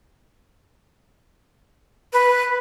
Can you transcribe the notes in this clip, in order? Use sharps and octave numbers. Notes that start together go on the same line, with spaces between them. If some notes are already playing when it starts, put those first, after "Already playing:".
B4